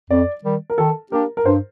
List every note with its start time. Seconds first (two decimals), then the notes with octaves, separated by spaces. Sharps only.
0.11 F2 D5
0.44 D#3 G3
0.70 A#4
0.78 D#3 A4
1.12 A#3 D4 G4 A#4
1.37 A#4
1.45 G2 C5